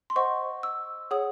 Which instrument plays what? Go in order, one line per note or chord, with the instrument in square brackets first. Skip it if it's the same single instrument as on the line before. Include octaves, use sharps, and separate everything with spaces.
[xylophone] C6
C5 D#5 F#5 C#6
E6
G#4 C#5 F#5 D#6